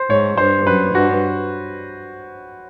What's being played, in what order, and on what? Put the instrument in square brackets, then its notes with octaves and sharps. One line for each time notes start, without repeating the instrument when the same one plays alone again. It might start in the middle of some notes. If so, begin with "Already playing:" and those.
Already playing: [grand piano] C5
[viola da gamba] G#2 [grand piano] C#5
[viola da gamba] G2 [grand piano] C5
[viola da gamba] F#2 [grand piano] B4
[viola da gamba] G2 [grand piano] F#4